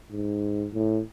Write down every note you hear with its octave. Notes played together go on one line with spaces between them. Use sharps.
G#2
A2